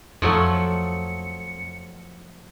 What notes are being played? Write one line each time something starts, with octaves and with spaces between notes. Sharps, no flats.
F2 F3 F#3 A3 C#7